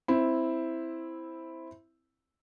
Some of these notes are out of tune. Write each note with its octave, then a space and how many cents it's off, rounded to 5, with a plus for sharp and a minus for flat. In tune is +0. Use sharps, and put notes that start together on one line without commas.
C4 +0 E4 +0